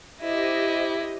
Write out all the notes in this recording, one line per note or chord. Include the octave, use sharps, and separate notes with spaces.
E4 G4 C5 D#5